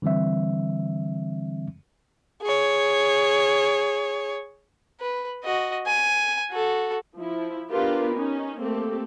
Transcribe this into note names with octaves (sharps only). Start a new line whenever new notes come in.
D3 E3 G3 C4 E5
G#4 C#5
B4
F#4 D#5
G#5
F#4 A4
F3 E4
B3 D4 F4 G4 A#4 B4
C#4 D#4
A3 A#3 C4 G4 A4